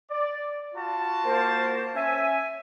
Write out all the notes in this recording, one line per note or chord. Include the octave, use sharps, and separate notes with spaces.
D5
F4 F#4 A5
A#3 A#4 C5
C#4 E5 G#5